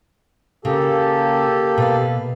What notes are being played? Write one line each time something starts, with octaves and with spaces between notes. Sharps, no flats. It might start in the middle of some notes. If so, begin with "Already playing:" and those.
C#3 A#3 G4 A4
B2 B4 F5